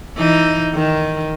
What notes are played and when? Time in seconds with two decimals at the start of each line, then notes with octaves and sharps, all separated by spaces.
0.17 E3 D#4
0.74 D#3